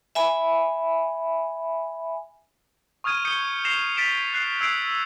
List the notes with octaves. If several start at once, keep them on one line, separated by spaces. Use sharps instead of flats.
E5 G#5 B5
C#6 D#6 F6 G#6 D#7
D#6 G6 C#7 G7
A#6 C7 E7 F7
A6 B6 D7 E7 F7
F#6 C7
E6 G#6 C7 D7 F7